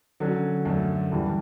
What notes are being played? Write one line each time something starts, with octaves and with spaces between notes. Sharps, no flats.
D3 F#3 C#4
F#2 D3 A3 C#4
G2 E3 G3